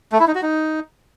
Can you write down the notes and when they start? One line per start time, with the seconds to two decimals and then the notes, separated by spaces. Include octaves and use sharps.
0.12 A3
0.20 E4
0.27 D#4
0.35 F#4
0.43 D#4